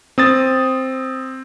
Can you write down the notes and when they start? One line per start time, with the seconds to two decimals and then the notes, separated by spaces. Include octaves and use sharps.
0.18 C4 D#6 A6